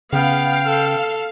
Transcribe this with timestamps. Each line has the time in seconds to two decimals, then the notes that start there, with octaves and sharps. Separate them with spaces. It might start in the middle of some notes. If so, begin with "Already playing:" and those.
0.13 C#3 B3 F5 G5
0.66 A4